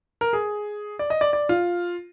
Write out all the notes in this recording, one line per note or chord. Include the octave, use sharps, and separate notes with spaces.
A#4
G#4
D5
D#5
D5
D5
F4